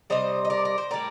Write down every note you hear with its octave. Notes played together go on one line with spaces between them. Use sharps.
C3 G3 C5 D#5
D#5
A#4 D5
A#4
C5
A2 G3 A#4 D5